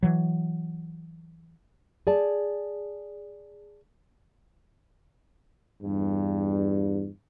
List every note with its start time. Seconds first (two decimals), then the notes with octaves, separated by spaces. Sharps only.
0.03 E3 F#3
2.07 G#4 D5 A5
5.83 E2 G2